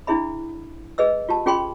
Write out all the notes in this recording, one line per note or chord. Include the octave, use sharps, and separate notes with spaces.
D4 E4 G#4 E5 B5
G#4 B4 D#5 E6
F4 G4 A5
C#4 F4 G#4 G5 B5 C6